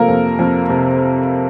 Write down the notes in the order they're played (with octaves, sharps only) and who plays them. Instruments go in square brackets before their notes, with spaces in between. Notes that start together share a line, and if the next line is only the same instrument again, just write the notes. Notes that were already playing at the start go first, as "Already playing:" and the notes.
Already playing: [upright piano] C3 F3 A#3 A4 A#4
F2
F2
C3